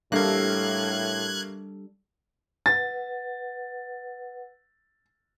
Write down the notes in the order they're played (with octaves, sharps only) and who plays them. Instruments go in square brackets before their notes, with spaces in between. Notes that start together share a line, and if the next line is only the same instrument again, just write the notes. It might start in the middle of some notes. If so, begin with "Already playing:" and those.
[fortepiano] A1 A#3 [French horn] A2 [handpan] G3 D4 A4 [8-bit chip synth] F#6 G#6
[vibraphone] B4 F#5 [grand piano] A6